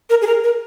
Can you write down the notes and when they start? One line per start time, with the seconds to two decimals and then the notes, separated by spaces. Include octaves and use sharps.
0.10 A#4
0.22 G#4
0.27 A#4
0.44 A#4